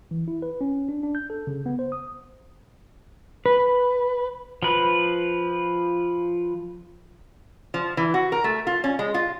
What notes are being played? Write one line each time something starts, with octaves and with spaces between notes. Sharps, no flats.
E3
E4
B4
C#4
D4
D4
G6
A4
C#3
B3
C5
D#6
B4
F3 B4
F3
E3
F#4
A#4
A3
F4
C#4
G#3
F4